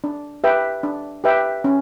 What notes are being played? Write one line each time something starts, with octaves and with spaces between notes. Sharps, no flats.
D4
G4 B4 E5 G5
D4
G4 B4 E5 G5
C#4